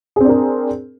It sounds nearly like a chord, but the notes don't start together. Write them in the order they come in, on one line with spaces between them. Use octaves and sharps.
G#4 C4 D4 A#4